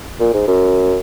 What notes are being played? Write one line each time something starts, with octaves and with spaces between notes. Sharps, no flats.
A#2
G#2
F#2